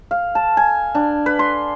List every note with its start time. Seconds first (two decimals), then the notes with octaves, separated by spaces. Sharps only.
0.11 F5
0.35 A5
0.57 G#5
0.95 D4
1.26 B4
1.39 C6